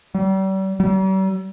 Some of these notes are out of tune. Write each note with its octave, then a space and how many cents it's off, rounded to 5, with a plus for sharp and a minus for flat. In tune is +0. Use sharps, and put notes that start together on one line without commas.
G3 -40
G3 -45